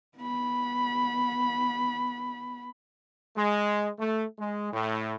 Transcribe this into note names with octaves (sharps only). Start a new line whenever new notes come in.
B3 B5
G#3
A3
G#3
A2